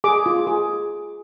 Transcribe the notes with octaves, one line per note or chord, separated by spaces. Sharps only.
G#4 D6
F4
G#4